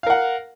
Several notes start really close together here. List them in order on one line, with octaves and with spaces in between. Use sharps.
F5 A#4 F#5